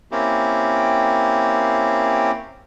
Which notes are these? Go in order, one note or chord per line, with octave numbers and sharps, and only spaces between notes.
A#3 C4 C#4 E4 G4